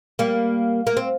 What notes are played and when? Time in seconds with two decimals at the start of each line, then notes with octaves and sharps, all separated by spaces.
0.19 G3 A#3
0.87 A#3
0.97 C4